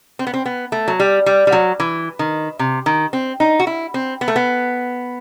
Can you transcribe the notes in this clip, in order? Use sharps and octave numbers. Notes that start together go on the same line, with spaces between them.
C4
B3
C4
B3
A3
F#3
G3
G3
G3
F#3
E3
D#3
C3
D#3
C4
D#4
F#4
E4
C4
B3
A3
B3